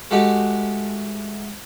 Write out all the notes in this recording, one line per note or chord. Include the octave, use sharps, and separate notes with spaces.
G#3 A3 F#4 G4